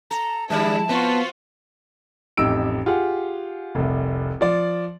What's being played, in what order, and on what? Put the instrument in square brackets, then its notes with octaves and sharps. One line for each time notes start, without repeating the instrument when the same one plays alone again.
[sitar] A4 [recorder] A#5
[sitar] D#3 G3 D4 [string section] F3 E4 [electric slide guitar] G#3 [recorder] A5
[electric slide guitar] B3 [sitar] C4 [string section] F4 F#4
[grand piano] A1 F2 D#4 G4 E6 D7
F4 G4 G#4 F#5
F1 C2
F3 D5